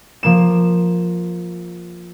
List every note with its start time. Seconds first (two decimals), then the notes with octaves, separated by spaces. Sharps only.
0.23 F3 A#3 E7